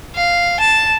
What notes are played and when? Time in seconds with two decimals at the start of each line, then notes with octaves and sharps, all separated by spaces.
0.15 F5
0.60 A5